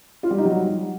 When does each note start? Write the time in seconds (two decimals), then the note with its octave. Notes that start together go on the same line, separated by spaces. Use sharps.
0.23 F4
0.30 G3
0.38 D#4
0.45 F#3